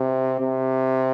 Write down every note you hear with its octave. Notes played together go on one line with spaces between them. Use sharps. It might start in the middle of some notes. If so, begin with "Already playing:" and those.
Already playing: C3
C3